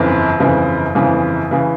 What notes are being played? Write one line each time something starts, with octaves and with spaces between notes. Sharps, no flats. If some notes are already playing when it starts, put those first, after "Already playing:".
Already playing: G1 F2 C#3 E3
G1 F2 C#3 E3
G1 F2 C#3 E3
C#3 E3